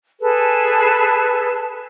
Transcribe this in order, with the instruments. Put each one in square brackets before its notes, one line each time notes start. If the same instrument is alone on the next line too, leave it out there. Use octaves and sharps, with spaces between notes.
[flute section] G#4 A4 B4